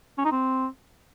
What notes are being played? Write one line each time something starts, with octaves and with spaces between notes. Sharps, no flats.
C#4
D#4
C4